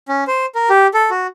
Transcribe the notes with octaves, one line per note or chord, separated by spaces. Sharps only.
C#4
C5
A#4
G4
A4
F#4